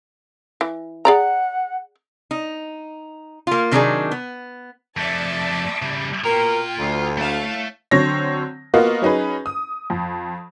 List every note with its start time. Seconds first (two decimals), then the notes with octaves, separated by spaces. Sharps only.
0.61 E3
1.05 G#4 D5 F#5 A#5
2.31 D#4
3.47 A#3 F4
3.71 C3 D#3 F#3 D4 D#4 G#4
4.11 B3
4.97 F2 A3 D5 E5 A5
5.82 C#3 G3
6.24 B2 F4 A#4 G5 A#5
6.78 D2
7.17 A3 E4 C#5 F5 A5
7.91 D3 F#3 C4 C#5 A#6
8.74 A#3 B3 F4 F#4 D#5
9.02 F#3 C#4 D#4 G#4 B4
9.46 D#6
9.90 F2